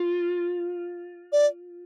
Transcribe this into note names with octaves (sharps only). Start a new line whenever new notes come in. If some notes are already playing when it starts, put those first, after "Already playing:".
Already playing: F4
D5